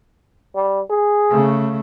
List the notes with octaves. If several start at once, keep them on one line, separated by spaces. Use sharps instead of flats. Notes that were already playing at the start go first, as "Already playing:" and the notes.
G3
G#4
C#3 A3